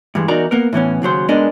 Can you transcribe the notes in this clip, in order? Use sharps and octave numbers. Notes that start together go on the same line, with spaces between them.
G2 E3 G#3
E2 D#4 F#4 A#4 D5 A#5
A#3 B3 A#4
A2 E3 B3 C#4
D#2 C#3 F#3 C5
G#2 G#3 B3 D4 A#4 D#5